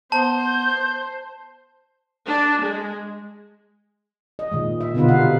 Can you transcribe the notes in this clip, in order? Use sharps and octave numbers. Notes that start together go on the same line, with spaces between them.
B3 C5 A5 G6
D4
G#3
D#5
A#2 D#3 G#3
E5
B2 D3 B3 D#4 F4 B4
C3 F5 F#5
E5